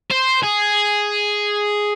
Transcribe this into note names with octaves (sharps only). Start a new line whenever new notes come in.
C5
G#4